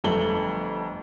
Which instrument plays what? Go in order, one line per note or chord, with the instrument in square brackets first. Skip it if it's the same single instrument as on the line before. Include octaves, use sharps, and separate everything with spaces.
[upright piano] G1 F2 A3 F#7 G7